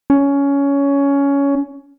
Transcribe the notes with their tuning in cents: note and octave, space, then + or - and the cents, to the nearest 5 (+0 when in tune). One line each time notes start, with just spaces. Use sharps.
C#4 +15